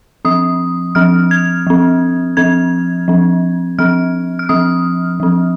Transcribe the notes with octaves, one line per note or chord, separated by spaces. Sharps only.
F3 C4 D#6
F3 C4 F6
G#6
F3 C4
F3 C4 G#6
F3 C4
F3 C4 F6
F6
F3 C4 D#6
F3 C4